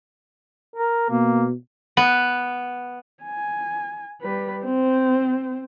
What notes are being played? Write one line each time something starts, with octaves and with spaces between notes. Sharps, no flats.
A#4
B2 A#3
B3
G#5
G3 B4
C4 C5